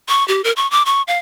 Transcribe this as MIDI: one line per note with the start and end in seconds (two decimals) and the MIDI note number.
0.09 0.26 85
0.28 0.42 67
0.44 0.52 70
0.56 0.70 85
0.71 0.83 86
0.86 1.02 85
1.08 1.18 77